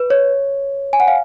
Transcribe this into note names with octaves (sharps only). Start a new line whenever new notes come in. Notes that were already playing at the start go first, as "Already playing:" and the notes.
Already playing: B4
C#5
G#5
F#5
F5